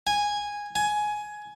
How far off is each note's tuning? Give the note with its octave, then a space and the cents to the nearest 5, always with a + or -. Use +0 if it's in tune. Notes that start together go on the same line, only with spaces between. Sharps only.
G#5 -10
G#5 +15